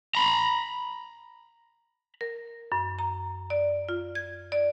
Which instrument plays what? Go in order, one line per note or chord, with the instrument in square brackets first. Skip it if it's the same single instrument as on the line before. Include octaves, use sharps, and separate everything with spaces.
[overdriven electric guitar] A#5 B5
[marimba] A#4
F#2
A#5
D5
F4
G#6
D5